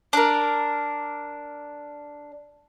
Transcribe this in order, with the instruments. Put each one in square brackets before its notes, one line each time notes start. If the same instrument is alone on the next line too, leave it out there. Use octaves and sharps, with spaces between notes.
[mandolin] D4 A#4